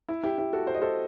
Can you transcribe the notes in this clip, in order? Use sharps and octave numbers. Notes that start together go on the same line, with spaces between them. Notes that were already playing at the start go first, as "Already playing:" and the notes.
E4
E4 G4
E4 G4
F#4 A4
C5
D#5
A4 C5